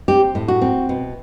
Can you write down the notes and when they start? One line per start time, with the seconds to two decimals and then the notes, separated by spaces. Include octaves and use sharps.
0.08 C4 G4
0.35 A2
0.48 F#4
0.61 C4
0.89 B2